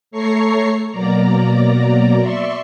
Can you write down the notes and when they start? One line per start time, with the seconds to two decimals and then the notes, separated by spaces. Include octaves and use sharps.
0.11 A3 A4 C#5 A#5 C#6 C7
0.91 B2 F#3 A#3 D5 A#5
2.19 D5 E5 C6 C#6